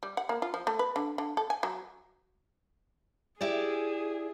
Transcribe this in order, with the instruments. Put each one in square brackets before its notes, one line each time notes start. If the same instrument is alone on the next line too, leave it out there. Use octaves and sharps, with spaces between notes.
[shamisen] G3
F#5
A#3
F4
F3
A3
B4
D3
D3
A4
G#5
F#3
[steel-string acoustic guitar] E4 G4 D5 [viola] G#4